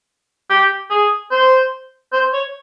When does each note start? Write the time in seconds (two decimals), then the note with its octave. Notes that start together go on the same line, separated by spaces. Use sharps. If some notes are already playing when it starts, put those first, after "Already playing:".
0.50 G4
0.90 G#4
1.31 C5
2.13 C5
2.33 C#5